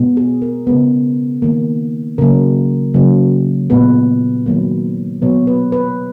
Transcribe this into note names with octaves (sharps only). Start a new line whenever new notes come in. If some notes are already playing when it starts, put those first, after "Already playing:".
Already playing: B2 G#3 B3
G#4
A#4
C#3 G#3 B3
D#3 A#3
C#3 F#3 A#3 A#4
C#3 F#3 A#3
A#2 G#3 B3 B4
D#3 F#3 A#3
B2 F#3 B3 C#5
B4
B4